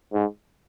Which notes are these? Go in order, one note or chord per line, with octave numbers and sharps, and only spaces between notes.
G#2